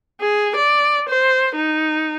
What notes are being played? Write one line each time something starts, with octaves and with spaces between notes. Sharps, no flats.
G#4
D5
C5
D#4